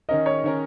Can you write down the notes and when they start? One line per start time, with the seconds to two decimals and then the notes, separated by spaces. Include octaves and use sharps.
0.09 D#3 C#4 A#4 D#5
0.26 C#5
0.44 D#3 C#4 A#4